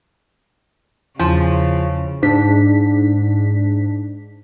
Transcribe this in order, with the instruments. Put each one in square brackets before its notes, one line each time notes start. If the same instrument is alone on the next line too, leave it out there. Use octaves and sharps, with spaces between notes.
[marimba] E2 [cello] C#3 [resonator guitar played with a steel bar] F3
[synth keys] G#2 D4 B6